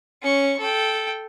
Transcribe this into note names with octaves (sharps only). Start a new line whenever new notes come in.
C#4 C#6
A4 G5